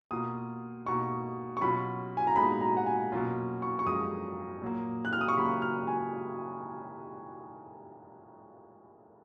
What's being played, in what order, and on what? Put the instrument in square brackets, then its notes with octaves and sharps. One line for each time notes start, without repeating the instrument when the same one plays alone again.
[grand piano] B2 A#3 F4 [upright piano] D#6
[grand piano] B2 A#3 D#4 [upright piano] C#6
[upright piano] C#6
[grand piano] B2 F#3 C#4 F4 [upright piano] B5
[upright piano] G#5
A#5
[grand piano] A#2 G#3 B3 D#4 [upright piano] B5
[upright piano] A#5
F#5
G#5
[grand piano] B2 F#3 A#3 C#4 F4
[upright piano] C#6
C#6
[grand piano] F#2 F3 G#3 [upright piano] D#6
[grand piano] A#2 F#3 A#3
[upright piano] F#6
F6
D#6
C#6
[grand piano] C#3 F#3 A#3 F4 [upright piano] B5
[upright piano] F6
G#5